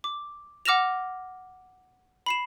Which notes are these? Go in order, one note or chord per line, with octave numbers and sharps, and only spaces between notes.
D6
F#5 D6 F6 A#6 E7 F7
B5 C7 E7